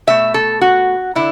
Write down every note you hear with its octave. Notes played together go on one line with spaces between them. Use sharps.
B2 A3 E5
A4
F#4
D3 E4